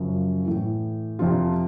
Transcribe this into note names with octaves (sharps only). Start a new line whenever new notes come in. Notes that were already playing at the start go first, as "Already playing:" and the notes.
Already playing: F#2 C#3 F3
A2 E3
F2 C3 F3 F4